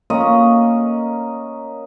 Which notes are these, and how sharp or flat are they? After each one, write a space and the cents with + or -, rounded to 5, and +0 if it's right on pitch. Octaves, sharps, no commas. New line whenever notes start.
A#3 +0 C#4 +0 D#5 +0